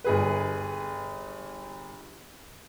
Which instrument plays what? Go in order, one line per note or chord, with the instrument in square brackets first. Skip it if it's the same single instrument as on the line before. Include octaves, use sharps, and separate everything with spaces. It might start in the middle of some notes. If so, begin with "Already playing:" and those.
[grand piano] G1 G#4 B4